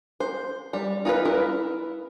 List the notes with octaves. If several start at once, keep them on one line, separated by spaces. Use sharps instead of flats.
C5
G3
D#4 F4 F#4 B4
E4 A#4 B4